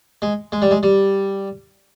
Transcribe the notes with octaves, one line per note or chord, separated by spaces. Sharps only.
G#3
G#3
G3
G#3
G3